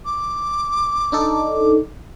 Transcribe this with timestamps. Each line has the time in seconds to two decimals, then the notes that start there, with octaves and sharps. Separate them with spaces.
0.05 D6
1.12 D4 D#4 A4